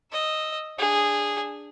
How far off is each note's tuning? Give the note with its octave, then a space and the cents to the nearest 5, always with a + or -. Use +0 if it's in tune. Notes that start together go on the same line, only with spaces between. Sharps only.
D#5 +0 E6 +0
D4 +0 G#4 -10